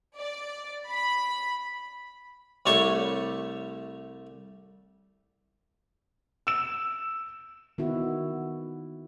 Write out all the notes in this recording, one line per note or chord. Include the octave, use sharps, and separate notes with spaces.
D5
B5
C2 G3 A3 A4 C#5 C#6
E6 E7
D#3 B3 E4 F#4